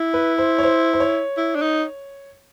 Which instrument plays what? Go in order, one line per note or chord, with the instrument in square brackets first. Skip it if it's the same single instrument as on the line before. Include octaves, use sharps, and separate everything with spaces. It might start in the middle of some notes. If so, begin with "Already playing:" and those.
Already playing: [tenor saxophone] E4
[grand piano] B4
C5
C#5
C5
C5
C#5
[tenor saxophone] E4
D4
D#4